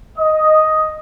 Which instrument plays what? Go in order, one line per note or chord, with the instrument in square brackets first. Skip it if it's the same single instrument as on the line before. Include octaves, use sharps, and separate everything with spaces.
[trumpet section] D#5